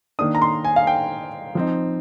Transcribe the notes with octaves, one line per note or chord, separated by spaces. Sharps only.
D#3 A#3 D4 D#6
A#5
C6
G#5
F5
G5
F3 C4 D#4